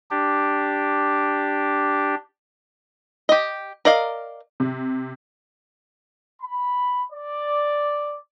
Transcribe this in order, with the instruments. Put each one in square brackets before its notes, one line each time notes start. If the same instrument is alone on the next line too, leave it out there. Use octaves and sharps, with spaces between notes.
[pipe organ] D4 G4
[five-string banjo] G4 D#5
A#4 D5 D#5 F5
[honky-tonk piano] C3
[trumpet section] B5
D5